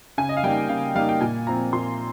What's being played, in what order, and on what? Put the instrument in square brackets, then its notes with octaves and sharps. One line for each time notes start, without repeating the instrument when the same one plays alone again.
[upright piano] C#3 G#5
D#5
F5
G3 A#3 D#4 G5
C#3 F5
G3 A#3 D#4 F5
G5
A#2 G#5
F3 C4 F4 A#5
A#2 C6